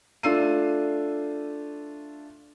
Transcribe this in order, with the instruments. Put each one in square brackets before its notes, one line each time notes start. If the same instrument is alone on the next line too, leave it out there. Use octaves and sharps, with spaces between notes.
[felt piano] A3 D4 F4 E6 C7 D#7